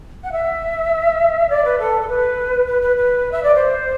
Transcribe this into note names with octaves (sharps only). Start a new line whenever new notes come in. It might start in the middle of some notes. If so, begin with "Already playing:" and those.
F#5
E5
D5
B4
A4
A4
B4
B4
B4
B4
E5
D5
C5